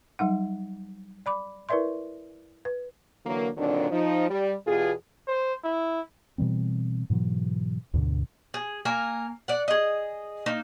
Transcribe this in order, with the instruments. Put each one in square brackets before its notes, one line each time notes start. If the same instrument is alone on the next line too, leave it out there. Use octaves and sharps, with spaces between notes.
[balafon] F#3 G3 D#4 F#5
D5 B5 D6
E4 A#4 B4 D5 E5 C6
B4
[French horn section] D3 E3 F#3 A#3
A#2 D3 D#3 F#3 C4 D4
F3 D#4
G3
E2 B2 F4 G4 G#4
[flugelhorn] C5
E4
[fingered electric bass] B2 E3 G3 C4
G#2 B2 E3 F#3
D2 G#2 B2 D3
[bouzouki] G#4
A#3 A#4 G#5
D5 F#5
G#4 D#5
A#3 D#4